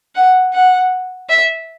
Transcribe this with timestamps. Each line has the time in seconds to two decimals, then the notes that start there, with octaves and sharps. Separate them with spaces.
0.15 F#5
0.53 F#5
1.29 E5